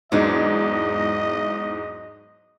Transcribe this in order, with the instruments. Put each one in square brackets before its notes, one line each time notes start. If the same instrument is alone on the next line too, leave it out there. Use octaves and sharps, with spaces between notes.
[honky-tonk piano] E2 G#2 [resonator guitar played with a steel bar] F#3 D4 D#4 [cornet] D#5